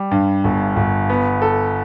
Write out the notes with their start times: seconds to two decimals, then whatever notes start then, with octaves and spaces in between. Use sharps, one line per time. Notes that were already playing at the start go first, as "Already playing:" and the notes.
Already playing: G3
0.11 G2
0.44 G1
0.76 G1
1.10 B3
1.42 A4